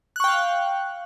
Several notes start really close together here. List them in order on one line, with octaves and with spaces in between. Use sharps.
F#6 C#6 G5 F5